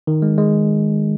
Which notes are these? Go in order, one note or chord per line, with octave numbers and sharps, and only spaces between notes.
D#3
G#3
G#3